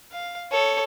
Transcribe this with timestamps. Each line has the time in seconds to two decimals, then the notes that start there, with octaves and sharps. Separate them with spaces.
0.12 F5
0.52 A4 C#5